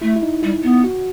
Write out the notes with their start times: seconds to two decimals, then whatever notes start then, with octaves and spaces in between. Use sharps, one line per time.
0.01 A3 E4
0.16 E4
0.23 D#4
0.43 G3 E4
0.63 B3
0.84 F#4